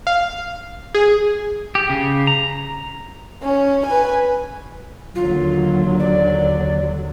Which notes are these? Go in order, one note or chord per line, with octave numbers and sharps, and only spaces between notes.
F5
G#4
G4
C#3
A#5
C#4
B4 G#5
D#2 D3 F#3 F4
D5